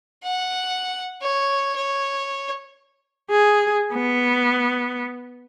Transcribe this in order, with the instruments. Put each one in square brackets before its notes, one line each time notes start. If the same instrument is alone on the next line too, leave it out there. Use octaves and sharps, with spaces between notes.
[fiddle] F#5
C#5
C#5
[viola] G#4
B3